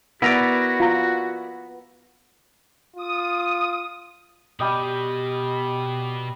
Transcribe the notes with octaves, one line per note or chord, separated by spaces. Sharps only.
B3 E4 F#4 A#4 D5
F4 A#5
F4 D#6
B2 G3 G4 D#5